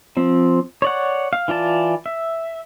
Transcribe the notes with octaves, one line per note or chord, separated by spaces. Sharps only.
F3 C4
C#5 D5 F#5
F5
E3 F4 D5 A5
E5